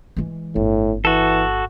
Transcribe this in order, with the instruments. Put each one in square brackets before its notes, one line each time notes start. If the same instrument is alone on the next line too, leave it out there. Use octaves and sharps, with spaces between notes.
[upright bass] E3 G#3
[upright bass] G1 [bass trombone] A2
[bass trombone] E3 [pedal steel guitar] F#4 A4